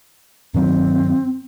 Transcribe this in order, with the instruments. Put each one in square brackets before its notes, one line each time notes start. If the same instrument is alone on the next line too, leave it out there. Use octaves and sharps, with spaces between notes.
[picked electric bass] G2 D#3 F#3 [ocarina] C4